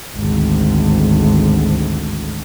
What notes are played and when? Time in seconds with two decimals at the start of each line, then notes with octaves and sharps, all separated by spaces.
0.16 G#1 D2